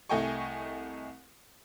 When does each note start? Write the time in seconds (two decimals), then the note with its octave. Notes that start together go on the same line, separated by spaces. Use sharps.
0.09 C2 A3 D#5 G5 G#5 C#6